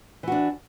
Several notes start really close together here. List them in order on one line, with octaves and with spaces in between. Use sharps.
E3 F#4 D4